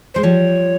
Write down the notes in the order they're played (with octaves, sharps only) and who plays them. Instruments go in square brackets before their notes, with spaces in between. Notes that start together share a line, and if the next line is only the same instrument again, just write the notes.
[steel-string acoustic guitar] G#3 [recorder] C5
[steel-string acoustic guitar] F3 G3 [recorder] C#5